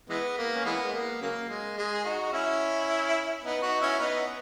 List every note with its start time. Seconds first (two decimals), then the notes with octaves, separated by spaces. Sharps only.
0.09 E3 G#3 B3
0.38 A#3
0.55 C#4
0.66 E3 G#3 B3
0.84 G#3
0.93 A#3
1.21 C#3 F#3 A#3
1.49 G#3
1.78 G#3
1.93 G#4
2.05 D#4 F#4
2.32 C#4 E4
3.44 B3 D#4
3.63 D#4 F#4
3.81 C#4 E4
4.00 B3 D#4